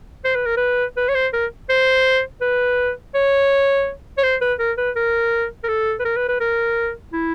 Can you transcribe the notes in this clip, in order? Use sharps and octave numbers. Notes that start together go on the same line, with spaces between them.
C5
B4
A#4
B4
B4
C#5
C5
A#4
C5
B4
C#5
C#5
C5
B4
A#4
B4
A#4
A#4
A4
B4
A#4
B4
B4
A#4
E4